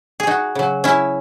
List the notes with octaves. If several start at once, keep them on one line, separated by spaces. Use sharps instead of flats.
G#4
D#4 F#4
C#3 F#3
C#4 E4